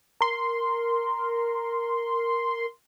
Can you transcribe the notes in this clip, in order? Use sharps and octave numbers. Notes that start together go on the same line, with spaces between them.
A#4 C6